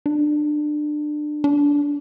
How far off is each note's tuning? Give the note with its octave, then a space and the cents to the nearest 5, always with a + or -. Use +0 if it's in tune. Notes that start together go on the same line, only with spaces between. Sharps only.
D4 +25
D4 -20